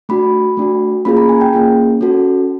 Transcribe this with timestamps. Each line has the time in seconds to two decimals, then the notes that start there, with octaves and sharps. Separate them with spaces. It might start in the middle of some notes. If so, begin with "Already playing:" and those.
0.09 A3 D4 F#4 B5
0.57 A3 D4 F#4
1.05 A#3 C#4 F4 G#4 B5
1.17 A#5
1.29 G#5
1.41 G5
1.53 A#3 C#4 F4 G#4
2.01 C#4 F#4 A4